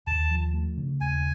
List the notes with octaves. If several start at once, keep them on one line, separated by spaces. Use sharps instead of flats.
D#2 A5
F3
A3
C#3
D#2 G#5